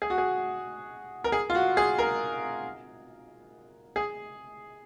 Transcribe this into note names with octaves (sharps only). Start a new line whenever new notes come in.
G#4
F#4
G#4
A#4
G#4
F4
F#4
G#4
A#4
G#4